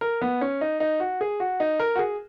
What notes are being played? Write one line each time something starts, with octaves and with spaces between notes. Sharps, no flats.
A#4
B3
C#4
D#4
D#4
F#4
G#4
F#4
D#4
A#4
F#4
G#4